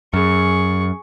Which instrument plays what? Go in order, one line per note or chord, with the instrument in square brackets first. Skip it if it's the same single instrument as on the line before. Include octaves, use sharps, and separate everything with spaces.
[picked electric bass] F#2 [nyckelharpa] G#4 C#6